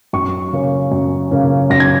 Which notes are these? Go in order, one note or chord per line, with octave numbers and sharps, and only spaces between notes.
F#2 C#6
C#3 A#3 C#4
F#2
C#3 A#3 C#4
F#2 A#6
G#6